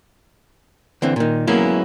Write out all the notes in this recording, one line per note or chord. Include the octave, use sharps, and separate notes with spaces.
D3 E3 C4
A#2 D#3
F#3 G#3 A#3 B3 C#4 E4